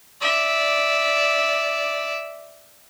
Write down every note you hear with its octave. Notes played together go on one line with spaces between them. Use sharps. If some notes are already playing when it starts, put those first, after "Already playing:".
D5 E5